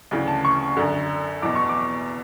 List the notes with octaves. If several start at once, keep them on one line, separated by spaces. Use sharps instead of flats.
D2 C#3 E3
A5
C#6
F#2 D3
E2 B2 D6
C#6
D6